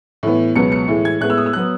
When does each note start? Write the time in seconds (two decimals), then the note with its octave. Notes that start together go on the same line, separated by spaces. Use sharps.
0.23 A2 E3 B3
0.56 C#2 B2 F#3 B3 C#7
0.72 C#7
0.88 A2 E3 G#3
1.05 G#6
1.20 A2 G#3 B3 F#6
1.30 E6
1.38 D#6
1.46 E6
1.53 F#3 B3 F#6